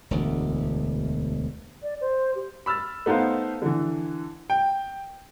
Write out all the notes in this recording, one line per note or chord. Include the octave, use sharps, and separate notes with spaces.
E1 D2
D5
C5
G4
B5 E6 F6 A6
A3 B3 D#4 C5 F5
D3 E3
G5